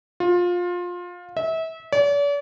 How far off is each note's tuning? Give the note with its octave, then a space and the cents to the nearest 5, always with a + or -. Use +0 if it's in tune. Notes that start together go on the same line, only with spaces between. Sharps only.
F4 +20
E5 -30
D5 -45